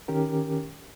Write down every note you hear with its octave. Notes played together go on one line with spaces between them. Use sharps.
D#3 C#4 G4 A#4